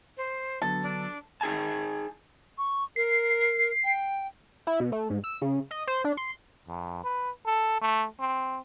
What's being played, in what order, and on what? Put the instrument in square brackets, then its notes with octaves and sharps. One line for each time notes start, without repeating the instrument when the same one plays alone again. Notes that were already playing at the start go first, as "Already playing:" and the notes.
[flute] C5
[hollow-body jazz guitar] D3 F#3 B3 [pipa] A4
[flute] D4
[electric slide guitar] D#4 G#4 G#5 A5
[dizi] C#6
[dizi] A#4 [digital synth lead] C7
[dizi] G5
[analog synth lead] E4
B2
A3
G#2
E6
C#3
D#5
C5
D4
C6
[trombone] F2
B4
A4
A3
C4